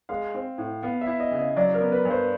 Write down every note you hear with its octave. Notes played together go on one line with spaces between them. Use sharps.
G#3 F5
C4
A2
B3 F5
E5
E4
D#5
C#3
D#5
F#3 D5
A#4
B3
B4
G2
C5